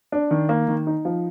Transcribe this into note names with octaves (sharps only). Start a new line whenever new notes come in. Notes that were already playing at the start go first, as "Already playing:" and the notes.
D4
D#3
A#3
D#3
D#4
F3